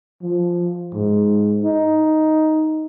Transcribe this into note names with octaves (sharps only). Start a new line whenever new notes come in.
F3
G#2
D#4